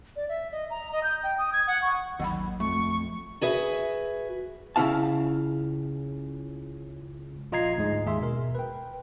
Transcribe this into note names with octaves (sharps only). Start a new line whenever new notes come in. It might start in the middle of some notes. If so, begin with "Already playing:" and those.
D5
E5
D#5
A#5
D#5
G6
G5
D#6
G#6
F#5
C#6
A1 D#2 F#3 F#5 B5
F2 A3 C#6
F#4 G#4 B4 E5
C#2 C#3 C#4 E4 F5 A5
A#1 F4 D#5 A#5 G#6 C7
D2 G#2 G#3
D#2 G#4 E5 C6
B2 A#4
B4 G5